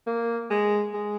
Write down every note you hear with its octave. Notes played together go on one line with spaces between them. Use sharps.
A#3
G#3
G#3